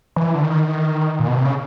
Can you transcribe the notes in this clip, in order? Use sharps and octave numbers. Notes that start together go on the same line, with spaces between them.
E3
D3
D#3
A#2
B2
C3
C#3